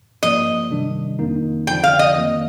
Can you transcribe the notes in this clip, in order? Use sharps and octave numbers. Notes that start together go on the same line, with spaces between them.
G2 F3 A#3 D#5
C3 D#3 G3 D4
F2 D#3 A#3 D#4
F2 D3 F3 G5
F5
D#5
F2 D#3 A#3